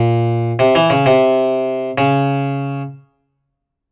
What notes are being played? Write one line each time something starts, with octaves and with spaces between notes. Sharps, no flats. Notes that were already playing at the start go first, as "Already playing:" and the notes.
Already playing: A#2
C3
E3
C#3
C3
C#3